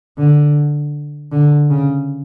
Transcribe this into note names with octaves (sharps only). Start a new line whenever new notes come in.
D3
D3
C#3